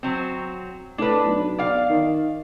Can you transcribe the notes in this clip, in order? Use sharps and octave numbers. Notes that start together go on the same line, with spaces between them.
F#3 C4
A2 D4 B4
B1
D5 F5
D#3